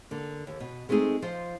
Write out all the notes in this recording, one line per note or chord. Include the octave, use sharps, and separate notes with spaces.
D3 A#3
D#2
B2
G#3 A3 C4 D#4 G#4
F3 F4 C5